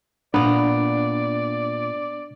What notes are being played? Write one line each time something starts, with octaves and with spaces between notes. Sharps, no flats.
A#2 B3 D4 D5 A#5